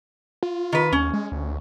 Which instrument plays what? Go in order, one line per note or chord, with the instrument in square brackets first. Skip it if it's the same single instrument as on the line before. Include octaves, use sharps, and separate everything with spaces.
[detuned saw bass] F4
[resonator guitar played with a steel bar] D#3 B4
[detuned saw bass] D#2 [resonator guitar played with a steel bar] C#4
[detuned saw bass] G#3
D2